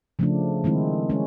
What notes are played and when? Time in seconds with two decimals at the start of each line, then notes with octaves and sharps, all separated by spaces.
0.19 C#3 F3 A3 D4
0.64 D#3 G#3 C4 E4
1.10 G#3 C#4